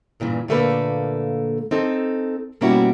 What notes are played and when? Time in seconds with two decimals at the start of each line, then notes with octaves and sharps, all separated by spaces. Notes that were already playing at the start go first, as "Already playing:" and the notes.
0.20 G2 A#2 C#3 E3
0.48 A#2 D3 A3 A#3 A4 B4
1.71 C4 D#4 A4
2.61 B2 G3 A#3 C#4 E4 F#4